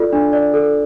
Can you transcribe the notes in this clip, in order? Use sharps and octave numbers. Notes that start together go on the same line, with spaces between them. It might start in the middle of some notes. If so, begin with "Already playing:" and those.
Already playing: F4 A4 D5
D4
D5
A4